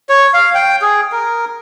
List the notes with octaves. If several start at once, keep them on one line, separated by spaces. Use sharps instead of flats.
C#5
F5
G5
G#4
A#4